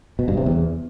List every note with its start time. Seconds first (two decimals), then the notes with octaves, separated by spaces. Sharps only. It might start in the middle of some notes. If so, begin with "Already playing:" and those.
0.19 B2
0.28 G2
0.37 C3
0.46 E2